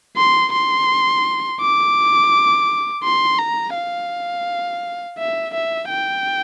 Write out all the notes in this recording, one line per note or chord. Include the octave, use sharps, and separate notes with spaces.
C6
C6
D6
C6
A#5
F5
E5
E5
G5